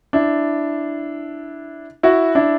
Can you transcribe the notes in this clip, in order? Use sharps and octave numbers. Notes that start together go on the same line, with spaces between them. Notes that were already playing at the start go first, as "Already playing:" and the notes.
D4 E4
E4 F#4
D4 E4